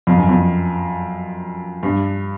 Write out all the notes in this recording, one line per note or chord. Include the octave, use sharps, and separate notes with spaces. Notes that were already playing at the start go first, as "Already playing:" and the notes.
F2
F#2
F2
G2